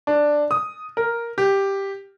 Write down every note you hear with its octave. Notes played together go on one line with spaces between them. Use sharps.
D4
D#6
A#4
G4